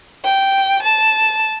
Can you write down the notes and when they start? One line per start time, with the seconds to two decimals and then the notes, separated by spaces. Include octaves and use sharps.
0.25 G5
0.82 A5